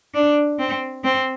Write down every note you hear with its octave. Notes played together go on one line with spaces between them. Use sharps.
D4
C4
C4